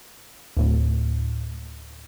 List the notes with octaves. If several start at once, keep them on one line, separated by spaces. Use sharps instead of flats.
D2 A2